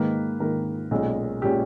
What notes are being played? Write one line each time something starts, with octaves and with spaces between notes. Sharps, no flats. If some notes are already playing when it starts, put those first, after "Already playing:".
Already playing: G#2 D#3 A#3 B4
G#2 D#3 A#3 A#4
B1 A#2 G#3 C#4
A#2 G#3 C#4 G4